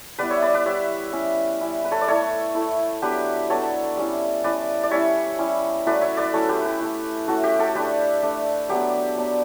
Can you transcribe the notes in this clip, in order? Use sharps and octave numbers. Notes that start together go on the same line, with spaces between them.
G3 B3 E4 B4 D5
C#5 E5
B4 D5
B4 D5
G3 B3 E4 C#5 E5
G3 C#4 E4
G3 C#4 E4
B4
A4 C#5
D5
A3 E4 A4 C#5
A3 E4
F#3 B3 D4 G4 B4
F#3 B3 D4 A4 C#5
G3 C#4 E4
G3 C#4 E4 B4 D5
D5
G3 C#4 E4 C#5 E5
G3 C#4 E4
F#3 A3 C#4 E4 B4 D5
C#5 E5
B4 D5
F#3 A3 C#4 E4 A4 C#5
G4 B4
G4 B4
A3 C#4 E4
A3 C#4 E4 F#4 A4
G4
F#4 A4
A3 D4 G4 B4
A3 D4
F#3 B3 D4 G4
F#3 B3 D4